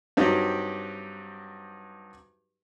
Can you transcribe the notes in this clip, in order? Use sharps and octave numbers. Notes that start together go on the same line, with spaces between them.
G2 F#3 C4 D#4 G4